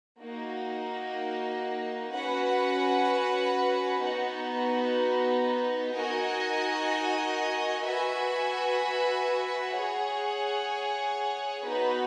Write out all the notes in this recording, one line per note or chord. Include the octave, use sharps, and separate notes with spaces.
A#3 D#4 F#4
C#4 F#4 B4 F#5
B3 D#4 F#4
D#4 F#4 A#4 D#5 G#5
F#4 B4 E5 G#5
G#4 C#5 F#5
B3 D#4 F#4 B4